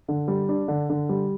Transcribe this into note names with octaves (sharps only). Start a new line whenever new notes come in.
D3
G3
D4
D3
D3
G3